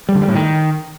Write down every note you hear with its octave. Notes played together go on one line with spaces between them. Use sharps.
G3
D3
G3
A2
D#3